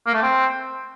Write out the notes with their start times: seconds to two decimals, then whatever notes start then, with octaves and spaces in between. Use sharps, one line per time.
0.06 A#3
0.14 A3
0.22 C4